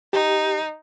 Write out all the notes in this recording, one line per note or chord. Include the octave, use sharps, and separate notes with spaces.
D#4 G4